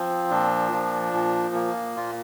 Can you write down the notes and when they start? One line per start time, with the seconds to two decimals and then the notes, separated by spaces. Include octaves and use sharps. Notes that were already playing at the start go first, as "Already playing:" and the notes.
Already playing: F3 C4
0.30 A#2 D4
0.72 F3
1.13 A#2
1.55 A#3
1.96 A#2 F4